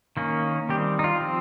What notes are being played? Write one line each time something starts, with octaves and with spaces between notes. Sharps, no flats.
D#3 A#3 C#4
D#3 G3 C4 G4
D#4
F4
F3 C4